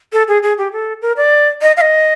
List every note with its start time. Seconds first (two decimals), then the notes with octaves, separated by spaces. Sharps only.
0.13 A4
0.28 G#4
0.43 G#4
0.58 G4
0.72 A4
1.02 A#4
1.17 D5
1.62 D#5
1.77 F5
1.81 D#5